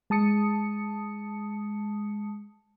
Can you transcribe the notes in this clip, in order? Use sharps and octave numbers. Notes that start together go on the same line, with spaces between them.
G#3 A5 D#6 C#7